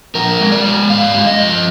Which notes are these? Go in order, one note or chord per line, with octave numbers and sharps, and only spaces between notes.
F3 A#4
G#3
D5
G#3
G#2 F5
G#3
D#5
F3